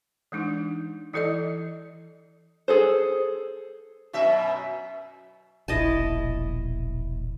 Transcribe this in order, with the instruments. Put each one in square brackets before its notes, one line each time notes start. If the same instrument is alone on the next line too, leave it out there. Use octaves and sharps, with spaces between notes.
[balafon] E3 G#3 D4 D#4
E3 E4 A4 D5 D#5
[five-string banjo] G#4 A4 C5
[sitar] F#2 B2 E5
[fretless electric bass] E1 A#1 [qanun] E4 D#5 A5